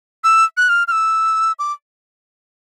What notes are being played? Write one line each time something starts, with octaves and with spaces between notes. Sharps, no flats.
E6
F#6
F6
F6
E6
D6